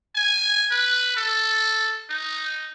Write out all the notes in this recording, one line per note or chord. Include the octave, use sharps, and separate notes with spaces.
G#5
B4
A4
D#4